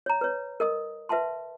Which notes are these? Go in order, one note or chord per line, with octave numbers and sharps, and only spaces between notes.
C#5 A#5
B4 C#5
A#4 D#5 D#6
B4 E5 F#5 A5 C6